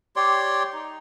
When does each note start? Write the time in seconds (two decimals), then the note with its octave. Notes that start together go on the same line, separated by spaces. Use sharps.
0.16 G4 C#5 D5 C6
0.73 D#4